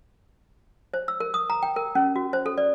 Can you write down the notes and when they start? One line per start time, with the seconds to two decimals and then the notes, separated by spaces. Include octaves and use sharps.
0.94 C5
1.08 E6
1.20 A#4
1.34 D#6
1.50 A#5
1.63 G5
1.76 A#4
1.95 C#4
2.16 F#4
2.33 C5
2.46 A4
2.58 D5